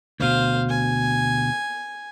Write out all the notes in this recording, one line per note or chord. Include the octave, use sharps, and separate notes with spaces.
D2 B2 C5 F5
G#5